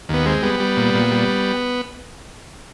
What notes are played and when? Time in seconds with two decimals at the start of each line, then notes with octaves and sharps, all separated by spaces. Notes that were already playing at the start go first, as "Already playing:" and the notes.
0.09 D#2 B3
0.26 G#3 C4
0.42 G3 B3
0.60 G3
0.77 A#2
0.94 A#2
1.11 G3